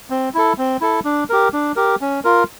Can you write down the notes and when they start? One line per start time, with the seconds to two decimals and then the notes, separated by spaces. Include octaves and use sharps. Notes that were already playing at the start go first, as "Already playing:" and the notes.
0.10 C4
0.34 E4 A4
0.58 C4
0.81 E4 A4
1.05 D4
1.30 G4 A#4
1.53 D4
1.76 G4 A#4
2.01 C#4
2.25 F4 A#4